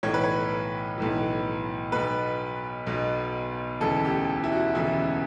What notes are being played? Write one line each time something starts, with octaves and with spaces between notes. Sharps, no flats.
B1 A2 E3 C#5
B4
C#5
B1 A2 E3
B1 B2 B4
B1 B2
E1 D2 C#3 E3 A4
G4
E4
F#4
E1 D2 C#3 E3 E4